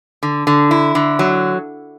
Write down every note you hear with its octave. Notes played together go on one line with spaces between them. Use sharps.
D3
D3
E4
D3
F#3